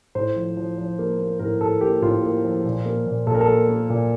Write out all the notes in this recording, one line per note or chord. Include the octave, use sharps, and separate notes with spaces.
A2 C5
F3
F3
F3
A#3
A#3
A2 A#4
A2 A4
A#3 G4
A2 F4
A#3
F3
A#2
A#3
A#2
A#2 A4
A#4
A4
A#3
A#3
A#2